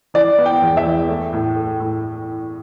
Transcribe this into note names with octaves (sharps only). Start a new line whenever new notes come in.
E3 D5
B3
G5
E2
E5
E2
A3
A2
A3
A2